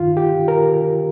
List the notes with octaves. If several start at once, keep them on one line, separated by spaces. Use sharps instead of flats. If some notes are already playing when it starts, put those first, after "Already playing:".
Already playing: G2 D#3 F4
G4
A#4